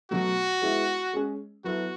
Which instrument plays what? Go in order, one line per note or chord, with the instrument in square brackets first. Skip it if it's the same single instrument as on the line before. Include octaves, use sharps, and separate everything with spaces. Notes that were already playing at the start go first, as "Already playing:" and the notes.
[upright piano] B2 F#3 A3 [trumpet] F#4
[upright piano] G#3 B3 E4
G#3 C#4 G#4
[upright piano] F#3 B3 E4 A4 [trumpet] F#4